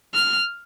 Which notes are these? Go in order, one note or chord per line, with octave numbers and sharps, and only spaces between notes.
F6